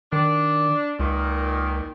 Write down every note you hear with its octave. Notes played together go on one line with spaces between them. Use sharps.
D#3 D4
C#2 A#2 D#3